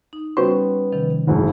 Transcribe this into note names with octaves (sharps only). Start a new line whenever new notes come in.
D#4
C#3 G3 B3 C#4 F#4 C5 C6
C3 D#3 F3
F#1 D2 G#2